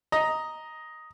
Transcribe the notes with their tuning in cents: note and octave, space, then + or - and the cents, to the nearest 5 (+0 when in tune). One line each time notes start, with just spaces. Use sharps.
D#5 +5 A#5 +0